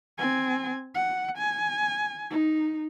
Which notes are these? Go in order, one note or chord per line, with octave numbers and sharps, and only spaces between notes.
C4 G#5
F#5
G#5
D#4